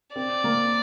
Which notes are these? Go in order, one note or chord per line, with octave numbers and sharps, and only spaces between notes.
C4 D5
A#3